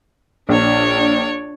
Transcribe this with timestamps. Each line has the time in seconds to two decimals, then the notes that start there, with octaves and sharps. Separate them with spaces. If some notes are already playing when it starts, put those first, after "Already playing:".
0.49 A#1 D4 C#5